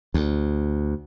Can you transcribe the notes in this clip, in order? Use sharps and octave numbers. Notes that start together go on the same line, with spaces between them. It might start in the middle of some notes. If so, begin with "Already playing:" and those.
D2